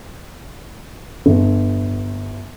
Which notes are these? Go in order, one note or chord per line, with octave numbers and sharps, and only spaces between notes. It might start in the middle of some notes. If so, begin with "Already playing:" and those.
G1